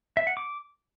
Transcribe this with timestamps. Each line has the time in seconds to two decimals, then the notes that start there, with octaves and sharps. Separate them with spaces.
0.17 E5
0.27 F#5
0.37 D6